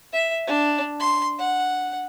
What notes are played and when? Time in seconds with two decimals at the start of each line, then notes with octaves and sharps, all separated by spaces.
0.13 E5
0.47 D4
1.00 C6
1.39 F#5